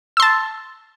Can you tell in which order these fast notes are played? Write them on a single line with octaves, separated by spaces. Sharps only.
E6 C6 A5